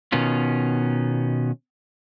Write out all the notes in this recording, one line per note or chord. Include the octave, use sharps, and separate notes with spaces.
B2 D#3 B3 C#4 F4